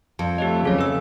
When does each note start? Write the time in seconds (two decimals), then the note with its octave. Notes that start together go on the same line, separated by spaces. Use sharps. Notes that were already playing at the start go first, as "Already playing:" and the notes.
0.19 F2 A5
0.38 A3 G4 C#5 D#5
0.64 D#2 C#3 F#3 G#4 A4 C5 F5
0.79 B4 E5 E6